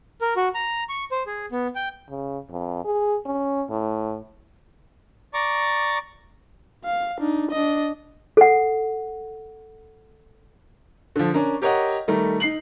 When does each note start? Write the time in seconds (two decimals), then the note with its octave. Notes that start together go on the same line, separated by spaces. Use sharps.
0.21 A#4
0.36 F#4
0.55 A#5
0.89 C#6
1.11 C5
1.26 G#4
1.52 B3
1.75 G5
2.10 C#3
2.50 F2
2.84 G#4
3.26 C#4
3.70 A2
5.34 D5 A#5 C#6 D6
6.85 F5
7.19 D4 D#4
7.52 D4 D#5
8.37 A4 F#5
11.16 D3 F3
11.34 C#4 D4 A#4
11.62 G4 A#4 C#5 D#5 F#5
12.08 D#3 G3 A3 A#4
12.40 D#4 C7 F#7